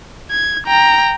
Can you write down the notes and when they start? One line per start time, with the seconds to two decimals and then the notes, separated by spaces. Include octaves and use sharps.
0.31 G#6
0.67 G5 A#5